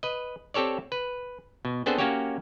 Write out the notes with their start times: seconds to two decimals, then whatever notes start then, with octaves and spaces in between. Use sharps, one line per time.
0.03 B4 D#5
0.54 C4 G4 A4 C#5 D5
0.92 B4
1.65 B2
1.86 B3 C4 D4 G#4 A4 C5
1.98 A#3 C#4 F#4 G4 C#5